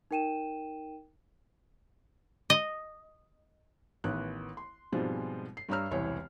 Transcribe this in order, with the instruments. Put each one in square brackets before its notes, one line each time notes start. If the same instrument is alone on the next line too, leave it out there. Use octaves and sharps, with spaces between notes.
[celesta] D#4 A#4 G5 D#7 E7
[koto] D#5
[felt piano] A1 D#3 B3 F#6
C6
G#2 B2 F3 G3 G#3 C4
C7
G2 G3 C#5 A#5 E6 F6
E1 C2 E3 C#5